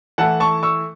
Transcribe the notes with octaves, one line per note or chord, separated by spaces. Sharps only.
E3 A3 E4 F#5 A5
A5 C#6
C#6 E6